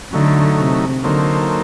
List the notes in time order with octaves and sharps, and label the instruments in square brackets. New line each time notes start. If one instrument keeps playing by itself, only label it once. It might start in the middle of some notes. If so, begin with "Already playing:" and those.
[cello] D3 [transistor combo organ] F#3 A3 D#4
[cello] C3
[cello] D3 [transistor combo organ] F#3 A#3 D#4 A4 C5